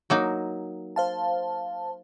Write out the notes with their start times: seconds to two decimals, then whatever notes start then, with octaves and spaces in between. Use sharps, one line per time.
0.10 F#3 A#3 D#4
0.96 C5 F5 A5